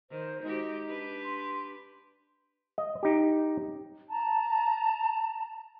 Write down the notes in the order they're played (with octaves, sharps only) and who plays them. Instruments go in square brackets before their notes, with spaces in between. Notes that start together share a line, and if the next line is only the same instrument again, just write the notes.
[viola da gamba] D#3 [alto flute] C5
[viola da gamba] G#3 F#4 G4 [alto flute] D#4
[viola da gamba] D4 G4 B4
[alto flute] C6
[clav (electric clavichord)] D#5
D#4 G4
[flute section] A5 A#5